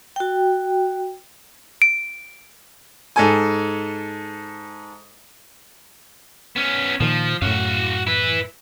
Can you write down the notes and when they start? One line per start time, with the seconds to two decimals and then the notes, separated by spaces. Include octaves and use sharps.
0.16 F#4 G5
1.82 D7
3.16 G#2 A4 G#5
6.56 B3 C#4
7.00 A#2 D#3 F3
7.42 F#2 A2 F#4 F5
8.07 E4 B4